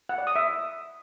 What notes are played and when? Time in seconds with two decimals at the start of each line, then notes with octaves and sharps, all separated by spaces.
0.09 F#5
0.18 D5
0.27 D#6
0.36 E5